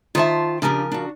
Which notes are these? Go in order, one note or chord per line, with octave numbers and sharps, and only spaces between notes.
D#3 F4 C5 E5 A5
C#3 F3 D4 G4 A#4
D4 F#4